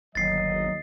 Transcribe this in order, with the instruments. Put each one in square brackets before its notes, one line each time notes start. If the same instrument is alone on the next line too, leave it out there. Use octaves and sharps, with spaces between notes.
[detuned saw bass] G1 [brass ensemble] D#2 D#5 [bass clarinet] F#3 [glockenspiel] A6 C7